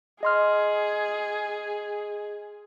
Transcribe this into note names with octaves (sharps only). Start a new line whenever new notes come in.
G#4 D#5 C6 F6